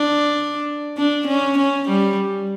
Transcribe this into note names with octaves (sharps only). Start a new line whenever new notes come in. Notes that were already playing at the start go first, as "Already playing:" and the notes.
Already playing: D4
D4
C#4
C#4
G3